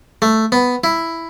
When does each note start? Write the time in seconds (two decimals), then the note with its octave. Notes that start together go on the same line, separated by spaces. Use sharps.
0.22 A3
0.52 B3
0.84 E4